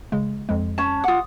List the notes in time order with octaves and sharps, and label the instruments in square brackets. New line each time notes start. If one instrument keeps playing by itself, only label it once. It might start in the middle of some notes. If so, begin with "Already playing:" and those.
[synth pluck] C#3 G#3
F2 F3 G#3
[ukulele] C#4 A5
[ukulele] F4 F#5 [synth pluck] D6 D#6